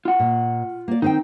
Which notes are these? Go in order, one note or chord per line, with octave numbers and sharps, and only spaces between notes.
F4 F#5
A#2
A#3 D5
D#3 C4 D#4 G5